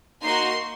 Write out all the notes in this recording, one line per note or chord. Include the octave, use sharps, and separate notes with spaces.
A#3 D#4 F#4 C6